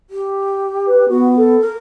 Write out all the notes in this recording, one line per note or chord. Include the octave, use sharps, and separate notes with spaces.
G4
B4
B3 F#4
A4
A#4